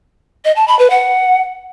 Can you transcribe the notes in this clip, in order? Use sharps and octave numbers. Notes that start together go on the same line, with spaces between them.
D#5
A5
B5
B4
F#5